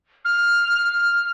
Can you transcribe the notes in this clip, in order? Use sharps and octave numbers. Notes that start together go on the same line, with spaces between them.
F6